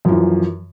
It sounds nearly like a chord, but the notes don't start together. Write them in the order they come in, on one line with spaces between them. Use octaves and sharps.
F#2 F3 E3